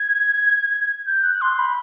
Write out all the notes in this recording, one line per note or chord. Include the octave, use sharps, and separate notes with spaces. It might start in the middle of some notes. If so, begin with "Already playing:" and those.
Already playing: G#6
G6
F#6
C6
B5